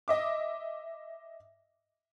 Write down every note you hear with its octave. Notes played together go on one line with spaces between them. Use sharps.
D#5 E5 D6